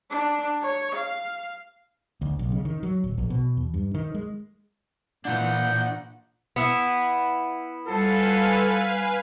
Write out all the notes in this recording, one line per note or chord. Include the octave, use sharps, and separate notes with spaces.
D4
C#5
F5
D2
B1
C#3
D#3
F#3
D1
A#1
B2
E2
G2
D#3
G#3
A#2 E3 D4 F4 F#5 G6
B3 E4
G3 F4 A4 B4 C5 F5 G#5